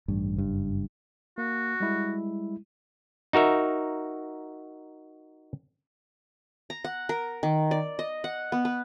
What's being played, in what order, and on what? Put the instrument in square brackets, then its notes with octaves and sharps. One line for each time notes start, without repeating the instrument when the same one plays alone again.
[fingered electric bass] A1 G2
F#1 G2
[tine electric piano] A#3 [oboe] F#4
[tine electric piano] G3 G#3 E4
[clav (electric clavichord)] D#4 F#4 A#4 E5
[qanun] A#5
F#5
A#4
D#3
D5
D#5
F#5
B3
B4